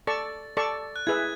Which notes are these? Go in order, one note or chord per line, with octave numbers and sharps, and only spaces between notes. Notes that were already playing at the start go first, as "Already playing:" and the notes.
A4 D5 A5 C#6 A6
A4 D5 A5 C#6
F#6
E4 G#4 B4 E5 G#6